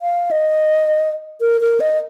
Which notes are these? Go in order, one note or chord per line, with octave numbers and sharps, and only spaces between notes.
F5
D#5
A#4
A#4
D#5